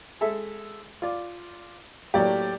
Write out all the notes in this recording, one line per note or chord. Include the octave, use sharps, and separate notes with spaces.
G#3 A4 E5
F4 D5
A2 F#3 A#3 G4 D5